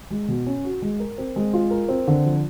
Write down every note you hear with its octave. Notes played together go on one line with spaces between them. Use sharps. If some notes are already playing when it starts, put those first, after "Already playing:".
G#3
B2
C#4
F#4
G#3
A#4
C4
G#3
F4
A#4
C4
D3
F3